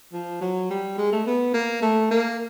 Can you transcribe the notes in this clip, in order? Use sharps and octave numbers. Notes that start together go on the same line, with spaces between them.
F3
F#3
G3
G#3
A3
B3
A#3
A3
A#3